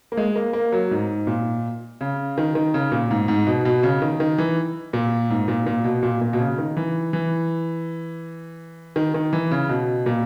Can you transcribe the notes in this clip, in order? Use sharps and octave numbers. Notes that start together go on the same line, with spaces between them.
A#3
G#3
A#3
A#3
F#3
G#2
A#2
C#3
D#3
D#3
C#3
A#2
G#2
G#2
B2
B2
C#3
D#3
D#3
E3
A#2
G#2
A#2
A#2
B2
A#2
A#2
B2
C#3
D#3
E3
E3
D#3
D#3
E3
C#3
B2
A#2